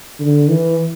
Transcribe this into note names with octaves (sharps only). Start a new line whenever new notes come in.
D3
E3